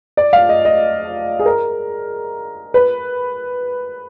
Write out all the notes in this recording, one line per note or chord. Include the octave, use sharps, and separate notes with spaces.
D5
F5
D#5
D#5
G#4
A#4
B4